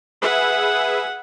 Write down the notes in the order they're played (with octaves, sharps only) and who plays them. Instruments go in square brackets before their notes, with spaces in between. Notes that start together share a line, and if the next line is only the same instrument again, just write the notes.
[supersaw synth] G#4 B4 E5 [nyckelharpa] F#5